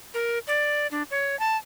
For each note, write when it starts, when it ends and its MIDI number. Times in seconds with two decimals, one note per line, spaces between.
0.14 0.38 70
0.47 0.87 74
0.91 1.03 62
1.10 1.38 73
1.39 1.57 81